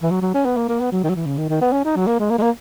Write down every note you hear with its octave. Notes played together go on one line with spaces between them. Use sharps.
E3
F#3
F#3
C#4
B3
A#3
A#3
B3
F#3
D#3
F#3
E3
C#3
D#3
D#3
B3
C#4
D#4
F#3
A#3
G#3
A#3
G#3
A#3